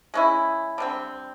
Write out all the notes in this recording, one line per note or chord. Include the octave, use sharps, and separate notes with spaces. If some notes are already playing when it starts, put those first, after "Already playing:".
G#3 C#4 E4
D3 G3 C4